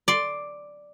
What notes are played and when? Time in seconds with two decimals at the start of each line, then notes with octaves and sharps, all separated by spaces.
0.08 D5 C6